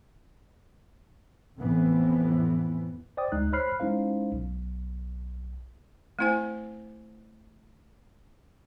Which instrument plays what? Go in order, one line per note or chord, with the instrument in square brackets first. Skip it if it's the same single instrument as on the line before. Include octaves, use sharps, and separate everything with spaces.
[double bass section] A1 F2 A2 E3 B3 C4
[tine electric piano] C5 D5 G5 D#6
D2 G#3 D#4 F#6
C5 C#5 B5 F6 F#6 C7
G#3 C#4 D#4 E4 C5 F5
B1
[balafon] A3 C4 E4 C5 G#5